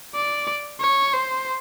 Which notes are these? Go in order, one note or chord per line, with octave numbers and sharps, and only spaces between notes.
D5
C#5
C5